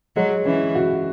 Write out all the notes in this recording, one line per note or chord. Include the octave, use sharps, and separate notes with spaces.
F#3 G#3
E3 C#4
F#4